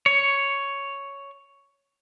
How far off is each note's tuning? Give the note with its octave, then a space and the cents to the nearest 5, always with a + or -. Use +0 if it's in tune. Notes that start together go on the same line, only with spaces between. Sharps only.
C#5 +5